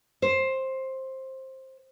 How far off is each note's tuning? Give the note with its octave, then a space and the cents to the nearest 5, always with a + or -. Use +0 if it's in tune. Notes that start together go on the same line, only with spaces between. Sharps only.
C5 +15